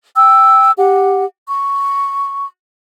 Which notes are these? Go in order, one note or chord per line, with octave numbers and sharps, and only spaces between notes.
G5 E6
G4 F#5
C#6